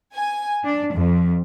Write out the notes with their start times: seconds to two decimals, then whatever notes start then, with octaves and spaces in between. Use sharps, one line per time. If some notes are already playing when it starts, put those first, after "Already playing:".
0.12 G#5
0.64 D4
0.94 F2